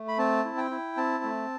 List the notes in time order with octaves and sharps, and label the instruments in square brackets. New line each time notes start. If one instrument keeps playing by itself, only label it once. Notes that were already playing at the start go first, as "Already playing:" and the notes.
Already playing: [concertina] A3
B5
C4 A5
E4
G5
E4
C4 A5
A3